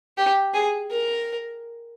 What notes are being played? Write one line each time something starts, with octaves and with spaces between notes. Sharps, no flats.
G4
G#4
A#4